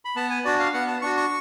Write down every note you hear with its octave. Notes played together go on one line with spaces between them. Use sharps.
B5
B3 A5
G#5
D4 F#4 D5
F5
B3 F#5
A5
D4 F#4 C#6
C#6